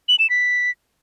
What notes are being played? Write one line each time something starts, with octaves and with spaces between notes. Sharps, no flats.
F#7
E7
B6